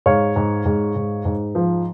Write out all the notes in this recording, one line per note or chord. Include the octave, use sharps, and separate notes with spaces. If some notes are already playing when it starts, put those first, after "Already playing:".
G#2 C#5 F5
G#2
G#2
G#2
G#2
F3